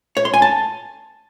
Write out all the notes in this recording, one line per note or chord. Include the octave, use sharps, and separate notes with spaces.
C#5
C6
G#5
A5